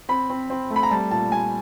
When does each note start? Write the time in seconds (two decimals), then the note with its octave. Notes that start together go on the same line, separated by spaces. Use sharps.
0.09 C4 B5
0.30 C4
0.50 C4
0.70 A3
0.76 B5
0.83 A#5
0.91 G3 A5
1.11 A#2 A5
1.32 G3 G#5